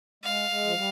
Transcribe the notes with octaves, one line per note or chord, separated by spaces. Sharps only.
G#3 F5
G#3
F3
G3